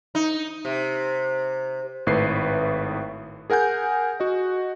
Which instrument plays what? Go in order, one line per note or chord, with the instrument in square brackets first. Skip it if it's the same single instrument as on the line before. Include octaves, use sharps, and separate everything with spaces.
[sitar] D#4
C3
[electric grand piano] G#1 A2 B4 C7
G#4 A#4 F#5 G#5 G6
F#4 D#5